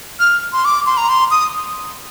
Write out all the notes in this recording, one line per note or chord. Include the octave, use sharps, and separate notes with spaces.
F6
C6
D6
C6
A#5
C6
D#6